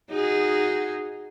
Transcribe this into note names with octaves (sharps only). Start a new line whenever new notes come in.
D#4 F#4 G#4